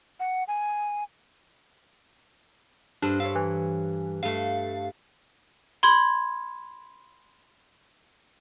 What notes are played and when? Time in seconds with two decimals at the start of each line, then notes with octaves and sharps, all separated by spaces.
0.20 F#5
0.48 G#5
3.02 G2 D4 A4 C5
3.20 C#5 E5 F5
3.35 E3
4.23 G2 A3 F5
5.83 B5 C6 G#6